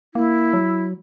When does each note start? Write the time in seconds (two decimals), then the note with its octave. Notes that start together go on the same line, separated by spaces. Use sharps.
0.14 A#3 E4
0.53 F#3